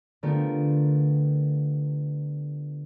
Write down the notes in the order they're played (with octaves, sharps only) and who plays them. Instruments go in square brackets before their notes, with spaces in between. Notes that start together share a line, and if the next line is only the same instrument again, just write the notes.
[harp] D3 A3 B3 F4 G4 A#4